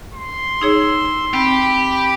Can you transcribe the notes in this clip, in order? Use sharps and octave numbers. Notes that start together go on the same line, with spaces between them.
C6
D#4 G#4 C#5 E6
C4 G4 B5